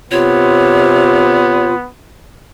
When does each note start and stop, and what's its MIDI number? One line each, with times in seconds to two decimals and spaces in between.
0.11 1.74 48
0.11 1.88 59
0.11 1.74 65
0.11 1.69 73